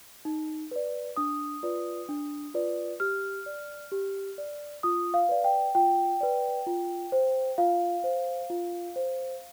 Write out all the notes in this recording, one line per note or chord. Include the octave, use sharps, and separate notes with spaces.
D#4
B4 D5
D4 D#6
F4 B4 D5
D4
F4 B4 D5
G4 F6
D5
G4
D5
F4 D#6
F5
B4 D5
G5
F4 G5
B4 D5
F4
C5
F4 F5
C5
F4
C5